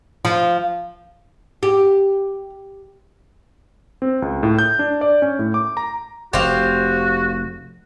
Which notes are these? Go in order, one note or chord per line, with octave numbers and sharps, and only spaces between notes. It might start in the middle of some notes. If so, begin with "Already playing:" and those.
F3
G4
C4
C#2
A2
G6
D4
D5
C#4
A2
D6
A#5
F1 F#4 G4 C5 F5